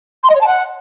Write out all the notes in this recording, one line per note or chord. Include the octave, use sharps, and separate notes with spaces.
C6
D#5
C#5
A5
F#5